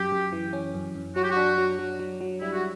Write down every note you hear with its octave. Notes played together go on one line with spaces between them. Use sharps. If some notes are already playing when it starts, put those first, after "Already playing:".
Already playing: F#2 G4
F#2
E3
C#4
F#2
F#2
F#3 F#4
G4
F#4
D4
F#3
F#3
F#3
F#3
G3 E4
F#4